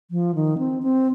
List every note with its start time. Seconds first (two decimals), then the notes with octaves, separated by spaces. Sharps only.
0.11 F3
0.35 D#3
0.58 C4
0.83 C4